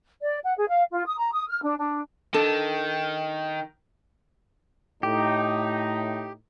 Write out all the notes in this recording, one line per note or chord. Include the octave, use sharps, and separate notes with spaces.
D5
F#5
G#4
F5
F4
D#6
A#5
D#6
F6
D4
D4
D#3 D4 A4
A2 D#4 G4